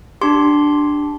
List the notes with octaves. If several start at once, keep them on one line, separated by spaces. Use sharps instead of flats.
D4 G4 C6